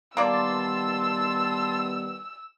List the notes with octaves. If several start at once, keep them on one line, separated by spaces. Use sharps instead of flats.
D#3 G3 A#3 B3 D5 A5 C6 E6